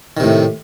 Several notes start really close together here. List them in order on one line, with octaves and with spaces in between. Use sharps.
D#3 C3 A2